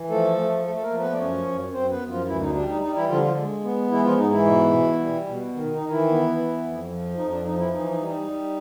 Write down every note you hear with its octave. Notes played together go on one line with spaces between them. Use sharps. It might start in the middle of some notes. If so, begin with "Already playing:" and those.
Already playing: E3
F3 A3 A4
A3
A3 A4
A4
A#3 A#4
F3
B3 B4
D5
F#2 C#4 C#5
F#2
F#2 C4 C5
B3 B4
F#2
F3 F4
D2 E3 E4
D#4
G3 D4
D#4
G3 D#4
E3 E4
D3 F3 F4
F3 F4
G#3
B3
E3 G#3 E4
F3 F4
G#2 D#4
E3 E4
B2
B2
G3
B2
D#3
D#4
D#3
E3 E4
B3
B3
F2
F3
F2 D#4
D4
F3 D#4
E3 E4
E3 D#4
D#4
G3
D#4
G3